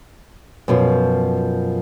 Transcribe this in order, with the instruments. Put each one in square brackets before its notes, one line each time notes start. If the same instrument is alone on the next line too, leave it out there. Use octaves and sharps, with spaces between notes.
[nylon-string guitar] F#2 B2 F3